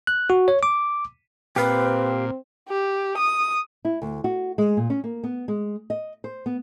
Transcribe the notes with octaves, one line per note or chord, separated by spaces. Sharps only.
F#6
F#4
C#5
D6
A#2 C4 G4 B4 F5
G4
D#6
E4
D2
F#4
G#3
A#2
C#4
A#3
B3
G#3
D#5
C5
B3